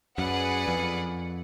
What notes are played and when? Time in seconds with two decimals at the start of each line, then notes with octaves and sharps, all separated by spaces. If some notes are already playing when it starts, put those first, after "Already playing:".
0.18 F#2 G#4 B4 D5 F#5
0.68 F2